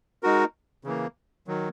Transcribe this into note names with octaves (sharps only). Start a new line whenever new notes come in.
G#3 D#4 F#4 A#4
C#3 E3 A#3
D#3 F#3